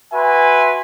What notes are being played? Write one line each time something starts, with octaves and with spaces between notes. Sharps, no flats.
F#4 B4 E5 G#5 C6